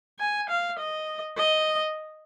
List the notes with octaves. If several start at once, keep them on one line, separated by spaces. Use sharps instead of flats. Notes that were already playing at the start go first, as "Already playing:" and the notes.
G#5
F5
D#5
D#5